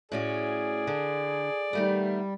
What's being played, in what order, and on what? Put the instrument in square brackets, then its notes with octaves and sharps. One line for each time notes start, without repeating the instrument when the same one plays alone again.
[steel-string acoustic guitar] A2 C#4 F#4 [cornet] G#4 [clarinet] D5
[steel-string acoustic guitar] D3
[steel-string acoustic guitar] D#3 A3 B3 [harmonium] G3